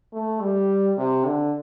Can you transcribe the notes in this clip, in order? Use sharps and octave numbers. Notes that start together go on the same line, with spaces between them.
A3
G3
C3
D3